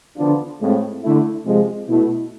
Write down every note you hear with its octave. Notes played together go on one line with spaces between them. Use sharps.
D3 F3 B3 D4 F4
A2 G#3 C4 F4
D3 A3 E4
C3 F3 G#3
B2 A3 E4